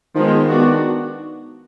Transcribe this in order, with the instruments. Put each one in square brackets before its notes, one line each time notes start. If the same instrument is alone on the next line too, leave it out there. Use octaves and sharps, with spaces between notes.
[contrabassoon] D#3 [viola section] F3 G#3 B3
[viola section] B3 D4 F#4